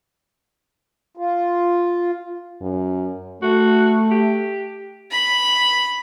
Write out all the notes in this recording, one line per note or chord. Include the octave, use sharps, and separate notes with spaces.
F4
F#2
A3 F#4
G4
B5